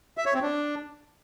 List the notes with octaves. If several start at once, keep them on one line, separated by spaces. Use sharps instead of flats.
E5
C#5
C4
D4